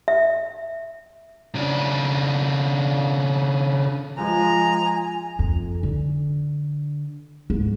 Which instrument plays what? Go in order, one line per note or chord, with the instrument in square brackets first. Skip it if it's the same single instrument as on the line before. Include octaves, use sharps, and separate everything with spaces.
[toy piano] E5
[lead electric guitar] C#3 D4
[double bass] F3 G#3 [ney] G#5 [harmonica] A#5
[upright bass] F2
D3
G#2